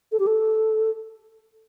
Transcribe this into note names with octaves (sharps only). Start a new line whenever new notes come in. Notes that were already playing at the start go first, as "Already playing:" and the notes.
A4
G4
A4